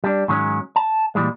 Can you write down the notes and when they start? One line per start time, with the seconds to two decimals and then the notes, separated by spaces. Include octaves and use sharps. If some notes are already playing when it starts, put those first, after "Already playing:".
0.04 G3 D4
0.28 G#2 D#3 F#3 G#3 C#4
0.76 A5
1.15 A#2 D3 E3 G3 G#3